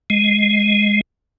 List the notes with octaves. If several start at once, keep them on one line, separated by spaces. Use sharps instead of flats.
G#3